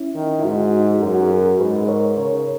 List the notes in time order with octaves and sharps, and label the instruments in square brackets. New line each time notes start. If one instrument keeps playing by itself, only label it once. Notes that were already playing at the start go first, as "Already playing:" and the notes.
Already playing: [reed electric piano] C#4 E4
[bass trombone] D#3
[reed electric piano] E4
[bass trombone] G#2 [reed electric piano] D#4 F#4
[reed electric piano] G#4
[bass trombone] F#2 [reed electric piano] F#4 A#4
[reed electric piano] G#4
F#4 A#4
[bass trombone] G#2 [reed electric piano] G#4 B4
[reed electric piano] A#4 C#5
[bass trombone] C#3 [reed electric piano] A#4 C#5